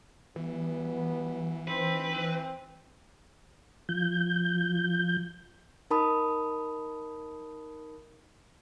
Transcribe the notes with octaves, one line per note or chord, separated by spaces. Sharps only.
E3 F#3 G3 B3
D2 D#3 C4 D#4 B4
F3 G6
D#4 A#4 A5 B5 D#6